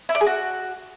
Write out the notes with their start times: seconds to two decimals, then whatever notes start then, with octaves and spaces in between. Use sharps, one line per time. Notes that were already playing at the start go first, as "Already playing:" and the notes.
0.09 E4
0.15 D5
0.21 G#4
0.27 F#4